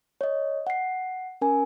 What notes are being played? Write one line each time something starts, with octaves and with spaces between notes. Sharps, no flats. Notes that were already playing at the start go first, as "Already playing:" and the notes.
C#5 D#5
F#5 C7
C#4 A#4 G#5